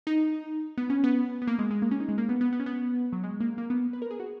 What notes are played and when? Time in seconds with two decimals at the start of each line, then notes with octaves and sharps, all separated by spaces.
0.07 D#4
0.78 B3
0.90 C#4
1.04 B3
1.42 B3
1.47 A#3
1.59 G#3
1.70 G#3
1.82 A#3
1.91 C#4
2.00 D#4
2.08 G#3
2.18 A#3
2.29 B3
2.41 B3
2.53 B3
2.60 C#4
2.66 B3
3.13 F#3
3.23 G#3
3.40 A#3
3.58 A#3
3.70 B3
3.93 B4
4.02 A#4
4.11 G#4
4.20 F#4